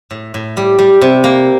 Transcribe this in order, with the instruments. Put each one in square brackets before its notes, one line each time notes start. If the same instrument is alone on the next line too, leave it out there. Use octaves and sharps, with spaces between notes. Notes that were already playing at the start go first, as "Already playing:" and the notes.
[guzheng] A2
A2
G3
G3
C3
A#3